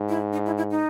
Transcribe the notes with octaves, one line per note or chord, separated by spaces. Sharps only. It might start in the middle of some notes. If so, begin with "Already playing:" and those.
Already playing: G#2
E4
D#4
E4
E4
D#4